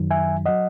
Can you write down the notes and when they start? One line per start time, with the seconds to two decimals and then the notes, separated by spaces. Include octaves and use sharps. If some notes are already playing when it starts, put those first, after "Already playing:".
Already playing: F#2 D#3 F#3
0.11 E5 G#5
0.46 F#3 D#5 F#5